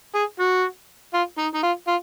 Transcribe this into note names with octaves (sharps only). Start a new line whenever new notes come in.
G#4
F#4
F4
D#4
D#4
F4
F4